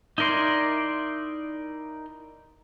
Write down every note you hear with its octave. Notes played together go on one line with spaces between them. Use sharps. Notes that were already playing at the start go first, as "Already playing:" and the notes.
D#4 E4 A#4 D5 C6